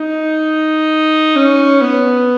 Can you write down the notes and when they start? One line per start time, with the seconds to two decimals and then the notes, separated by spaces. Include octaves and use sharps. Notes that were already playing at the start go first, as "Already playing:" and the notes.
Already playing: D#4
1.36 C#4
1.81 B3